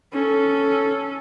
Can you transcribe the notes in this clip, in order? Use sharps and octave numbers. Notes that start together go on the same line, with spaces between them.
C#4 A4